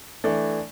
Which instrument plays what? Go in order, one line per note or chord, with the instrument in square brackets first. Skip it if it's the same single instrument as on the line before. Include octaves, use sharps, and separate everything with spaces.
[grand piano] E3 A3 D4